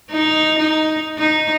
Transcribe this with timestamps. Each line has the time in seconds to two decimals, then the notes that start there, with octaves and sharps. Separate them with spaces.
0.11 D#4
0.59 D#4
1.18 D#4